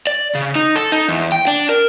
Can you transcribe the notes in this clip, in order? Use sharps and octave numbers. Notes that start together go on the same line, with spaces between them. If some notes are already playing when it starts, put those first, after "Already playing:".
D5
C#3
D#4
A4
D#4
E2
G5
D4
A#4